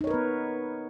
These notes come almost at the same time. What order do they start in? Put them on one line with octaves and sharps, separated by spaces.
D#4 C#5 A#4 B4 B3